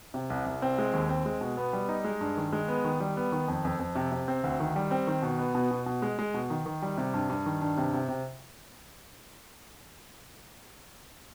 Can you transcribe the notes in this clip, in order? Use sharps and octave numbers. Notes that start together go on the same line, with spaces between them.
C3
C2
C2
C4
G#3
D#2
C4
G#3
B2
B3
G3
D#4
G#3
G2
D#3
G#3
B3
D#3
G3
B3
D#3
F2
F2
F2
C3
C3
C4
D2
D#3
G3
C4
D#3
B2
B3
B2
B2
B2
G#3
G#3
B2
D#3
D#3
G3
C3
G2
G2
D#3
G2
C3
C3
C3